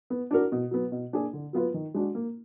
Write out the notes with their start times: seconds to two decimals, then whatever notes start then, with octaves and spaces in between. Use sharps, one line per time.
0.10 B3
0.31 D4 F#4 A#4
0.52 B2
0.71 F#3 B3
0.92 B2
1.13 A#3 D4 G#4
1.33 D3
1.53 F#3 B3 F4 B4
1.74 D#3
1.94 G#3 D4 F#4
2.15 A#3